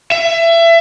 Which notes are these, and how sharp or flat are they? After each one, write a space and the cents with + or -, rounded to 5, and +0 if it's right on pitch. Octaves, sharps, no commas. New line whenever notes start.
E5 +25